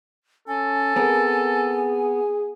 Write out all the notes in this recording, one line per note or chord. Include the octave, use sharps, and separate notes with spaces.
C#4 A4 G#5
B3 C4 G#4 A#4